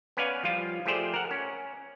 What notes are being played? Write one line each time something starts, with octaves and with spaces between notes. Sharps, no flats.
B3 C#4 B4 D5 F5 G#5
F3 G3 F4
F3 A3 G4 G#4 C5 D5
A#4 F#5
C#4